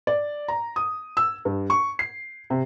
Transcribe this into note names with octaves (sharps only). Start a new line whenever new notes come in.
D5
A#5
D#6
E6
G2
C#6
C7
C3